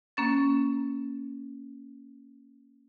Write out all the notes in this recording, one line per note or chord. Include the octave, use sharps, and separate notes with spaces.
A#3 C#4 A6